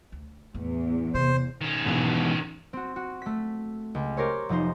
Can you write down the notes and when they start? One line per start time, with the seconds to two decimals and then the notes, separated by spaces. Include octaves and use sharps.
0.12 D2
0.55 E2 A2
1.14 C3 C5
1.61 D#3 C#4
1.86 G#2 B2 E3
2.73 C4 F#4
2.96 F#4
3.22 A3 B6
3.95 C#2
4.17 G4 A#4 C5 C#5
4.49 F1 F3 D#4 C5